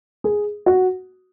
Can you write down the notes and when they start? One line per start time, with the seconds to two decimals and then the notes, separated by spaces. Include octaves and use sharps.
0.24 G#4
0.66 F#4